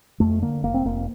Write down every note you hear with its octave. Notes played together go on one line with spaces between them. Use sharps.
F2 A3
D3 A#3
F1 A#3
C4
F1 A#3